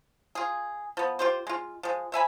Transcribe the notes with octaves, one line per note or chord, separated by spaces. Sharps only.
F4 G#4
F3 B3
F4 G4 C5
G#3 F4
F3 G#3
C5 E5 G#5 B5